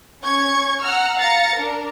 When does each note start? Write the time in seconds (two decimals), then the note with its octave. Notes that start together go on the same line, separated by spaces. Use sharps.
0.23 C#4 C#6 G#6
0.82 F#5 A#5 E6 F6
1.16 F5 A#5 A6 A#6 C#7
1.54 D4 A#4